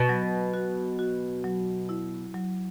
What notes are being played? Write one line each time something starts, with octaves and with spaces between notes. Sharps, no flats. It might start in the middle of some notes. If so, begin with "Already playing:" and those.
Already playing: B2
F#3
F#4
F#4
F#3
E4
F#3